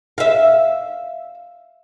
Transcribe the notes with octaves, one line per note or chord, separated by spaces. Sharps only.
E5 F5